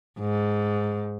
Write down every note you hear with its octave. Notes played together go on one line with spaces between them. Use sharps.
G#2